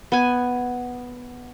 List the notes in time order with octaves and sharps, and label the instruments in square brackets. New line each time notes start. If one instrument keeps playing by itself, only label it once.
[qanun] B3 G#5